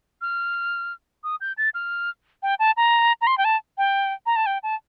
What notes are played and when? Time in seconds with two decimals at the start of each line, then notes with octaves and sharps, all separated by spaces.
0.22 F6
1.24 D#6
1.41 G6
1.58 A6
1.74 F6
2.43 G5
2.59 A5
2.77 A#5
3.21 A#5
3.27 C6
3.38 G5
3.45 A5
3.78 G5
4.26 A#5
4.36 A5
4.46 G5
4.63 A5